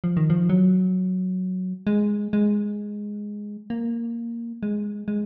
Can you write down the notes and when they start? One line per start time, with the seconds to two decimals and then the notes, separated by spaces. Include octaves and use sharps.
0.04 F3
0.17 D#3
0.30 F3
0.49 F#3
1.87 G#3
2.33 G#3
3.70 A#3
4.63 G#3
5.08 G#3